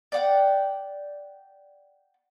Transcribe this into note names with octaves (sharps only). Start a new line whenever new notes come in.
D5 F#5 G5